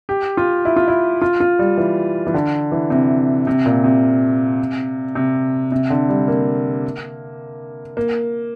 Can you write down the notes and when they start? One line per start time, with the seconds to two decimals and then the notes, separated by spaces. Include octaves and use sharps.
0.09 G4
0.37 F4
0.65 E4
0.76 F4
0.88 E4
1.22 F4
1.40 F4
1.59 G3
1.78 E3
2.27 E3
2.34 D3
2.72 E3
2.90 C3
3.47 C3
3.66 A#2
3.84 C3
5.15 C3
5.72 C3
5.90 D3
6.09 G3
6.28 A#3
7.97 A#3